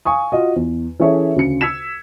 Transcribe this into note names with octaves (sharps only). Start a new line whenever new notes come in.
F5 G#5 C#6 D#6
F4 F#4 D#5
E2
E3 C#4 G#4 A4 C#5 E5
D2 C#3 C#7
E6 G#6 B6 E7